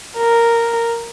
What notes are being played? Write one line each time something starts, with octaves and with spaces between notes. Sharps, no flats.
A#4